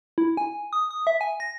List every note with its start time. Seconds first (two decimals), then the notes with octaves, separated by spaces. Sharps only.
0.18 E4
0.37 G#5
0.73 D#6
0.91 D#6
1.07 E5
1.21 G#5
1.40 A#6